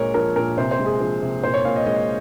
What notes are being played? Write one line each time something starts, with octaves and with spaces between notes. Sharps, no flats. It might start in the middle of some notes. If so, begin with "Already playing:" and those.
Already playing: A#2 G#3 A#4 C#5
F3 A#4
A#2 A#4
C3 C5
C5
G#3
G#4
F3
C3
A#2 C5
C#5
A#2 F5
D#5
G#3 D#5